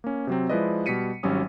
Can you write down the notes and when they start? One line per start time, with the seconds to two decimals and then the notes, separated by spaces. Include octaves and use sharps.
0.04 A#3 C#4
0.27 C3 F#3 C4
0.49 F3 G#3 E4 B4 D5 D#5
0.86 B2 G3 B6 C#7 D#7
1.23 G#1 F#3 G3 C#4 D#6